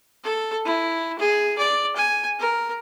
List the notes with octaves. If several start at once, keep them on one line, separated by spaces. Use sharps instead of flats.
A4
E4
G#4
D5
G#5
A#4